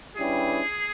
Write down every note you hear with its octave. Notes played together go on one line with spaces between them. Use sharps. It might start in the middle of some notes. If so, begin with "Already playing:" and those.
G2 G3 C#4 E4 G4 G#4